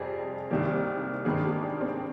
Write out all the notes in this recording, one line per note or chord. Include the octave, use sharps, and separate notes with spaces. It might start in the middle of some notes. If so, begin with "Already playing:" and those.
Already playing: F2 C3 G3 G#4
C2 C3 D#3 G3 A#3
G#1 G2 D#3 A#3 G#4
G4
D4
C4